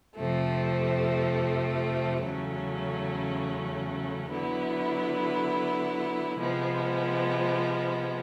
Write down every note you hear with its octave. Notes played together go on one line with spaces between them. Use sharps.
F2 C3 F3 A3
E2 C#3 F#3 A3 C#4
D3 F#3 B3 E4
C3 F3 G#3 B3